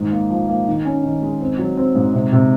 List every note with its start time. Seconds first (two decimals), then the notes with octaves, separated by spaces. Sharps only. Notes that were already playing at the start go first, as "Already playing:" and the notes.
Already playing: G#2 D#3
0.11 A#3
0.30 F3
0.48 A#3
0.67 D#3
0.85 C#4
1.03 D#3
1.22 G#3
1.40 C4
1.58 F#3
1.77 C4
1.95 G#2
2.14 C3
2.32 C3